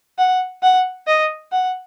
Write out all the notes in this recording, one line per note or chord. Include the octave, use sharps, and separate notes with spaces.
F#5
F#5
D#5
F#5